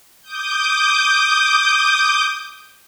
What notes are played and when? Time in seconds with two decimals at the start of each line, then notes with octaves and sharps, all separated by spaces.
0.22 D6 D#6 G6